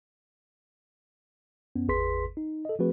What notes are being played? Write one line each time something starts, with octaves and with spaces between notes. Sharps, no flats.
F#2 B3 C#4
G#1 E2 G#4 B4 C6 B6
D#4
A4 D#5
F3 A3 C4 F#4 G#4 B4